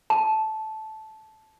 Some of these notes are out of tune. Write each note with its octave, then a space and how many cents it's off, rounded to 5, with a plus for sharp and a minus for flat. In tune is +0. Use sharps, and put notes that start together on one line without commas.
A5 -15